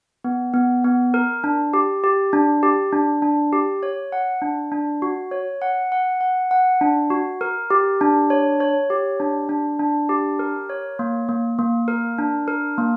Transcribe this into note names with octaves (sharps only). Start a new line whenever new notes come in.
B3
B3
B3
A#4
D4
G4
G4
D4
G4
D4
D4
G4
C#5
F#5
D4
D4
F#4
C#5
F#5
F#5
F#5
F#5
D4
F#4
A#4
G4
D4
C#5
C#5
G4
D4
D4
D4
G4
A#4
C#5
A#3
A#3
A#3
A#4
D4
A#4
A#3